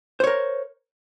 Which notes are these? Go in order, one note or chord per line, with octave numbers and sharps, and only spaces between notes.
A#4 C5 C#5